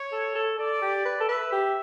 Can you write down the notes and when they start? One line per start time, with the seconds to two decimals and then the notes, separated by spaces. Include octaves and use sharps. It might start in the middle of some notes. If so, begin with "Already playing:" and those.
Already playing: C#5
0.12 A4
0.35 A4
0.58 A4 D5
0.82 G4
1.05 B4
1.20 A4
1.29 B4 E5
1.52 G4